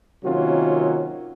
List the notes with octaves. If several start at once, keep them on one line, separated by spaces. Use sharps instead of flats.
C3 D#3 F#3 A#3 C#4 F4